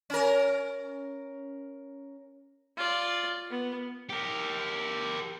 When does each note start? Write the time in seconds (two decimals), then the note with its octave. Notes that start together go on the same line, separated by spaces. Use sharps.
0.10 C#4 A#4
2.77 F4 D5
3.51 B3
4.09 G4 A#4